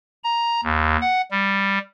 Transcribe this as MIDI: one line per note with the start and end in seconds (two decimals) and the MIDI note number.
0.24 0.61 82
0.64 0.97 39
1.01 1.22 78
1.31 1.78 55